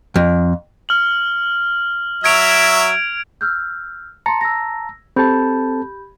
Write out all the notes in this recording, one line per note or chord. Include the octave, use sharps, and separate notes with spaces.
F2
F6 F#7
F#3 E5 G#6 D7 F7
E6 F6 G6
A5 A#5 C6 C#7
E6 A#6
C4 G4 A4 A5 B5 G6